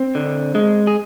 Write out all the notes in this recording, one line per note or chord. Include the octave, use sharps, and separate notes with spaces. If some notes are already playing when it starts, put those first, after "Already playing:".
Already playing: C4
D3
G#3
G#4